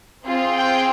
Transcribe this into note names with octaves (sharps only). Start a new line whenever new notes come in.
C4 F4 G#4
G5